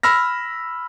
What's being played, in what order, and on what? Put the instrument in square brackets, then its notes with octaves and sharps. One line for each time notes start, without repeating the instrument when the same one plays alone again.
[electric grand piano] B5 E6 F6 A#6